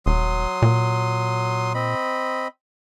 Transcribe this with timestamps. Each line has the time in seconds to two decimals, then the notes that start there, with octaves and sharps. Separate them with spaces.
0.06 D#1 F#3 C6 D#6
0.62 A#2
1.75 C4 D#5 B5